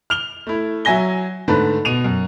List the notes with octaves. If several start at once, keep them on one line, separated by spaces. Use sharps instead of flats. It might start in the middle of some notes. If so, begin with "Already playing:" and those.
F6 F7 G7
A3 E4
F#3 E5 G#5 A#6 G7
G#2 D3 A3 B4 A5
B2 D#7 F7
F#2